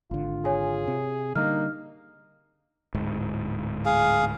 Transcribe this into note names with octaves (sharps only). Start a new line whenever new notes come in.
G#1 D3 F4
G#4 C#5 G#5
C3
D3 G3 A#3 D#4 F6
D1 G#2
G#4 F5